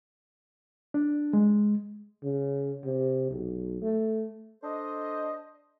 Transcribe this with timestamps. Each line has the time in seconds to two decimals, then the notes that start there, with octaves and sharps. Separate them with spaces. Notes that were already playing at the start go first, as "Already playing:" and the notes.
0.94 D4
1.33 G#3
2.23 C#3
2.85 C3
3.30 B1
3.82 A3
4.63 D4 A4 C5 D#5